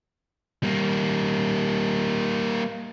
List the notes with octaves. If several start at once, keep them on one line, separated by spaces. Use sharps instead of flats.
G3 A#3